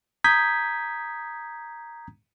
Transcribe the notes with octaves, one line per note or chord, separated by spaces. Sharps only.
A#5 D#6 G6 G#6 B6